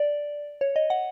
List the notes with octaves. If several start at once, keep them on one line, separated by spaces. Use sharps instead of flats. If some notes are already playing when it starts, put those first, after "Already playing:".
Already playing: D5
C#5
D#5
F#5